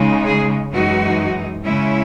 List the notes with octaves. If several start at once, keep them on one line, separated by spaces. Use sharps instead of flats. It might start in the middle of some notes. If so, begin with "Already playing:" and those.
Already playing: C#3 G#3 D#4
G#4
F#2 E3 G#3 D#4 F#4
C#3 G#3 C#4 E4